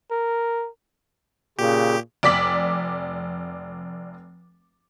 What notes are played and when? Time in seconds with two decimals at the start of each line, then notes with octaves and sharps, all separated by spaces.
0.11 A#4
1.58 A#2 C#3 G4
2.23 F1 D5 D6 B6 F#7